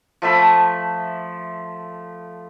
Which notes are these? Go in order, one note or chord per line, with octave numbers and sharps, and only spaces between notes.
F3 A3 E5 B5